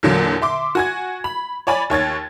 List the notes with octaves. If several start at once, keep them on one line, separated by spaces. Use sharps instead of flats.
E2 A#2 D3 F#3 A#3
E5 C6 D6
F#4 G#5 G#6
B5
C#5 D5 G#5 B5 A6
D#2 C#5 G#6 A6